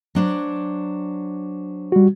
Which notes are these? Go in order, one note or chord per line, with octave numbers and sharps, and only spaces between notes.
F#3 D4 C5
G3 F#4